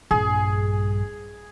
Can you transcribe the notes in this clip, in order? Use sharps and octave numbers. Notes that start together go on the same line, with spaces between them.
A#1 G2 G#4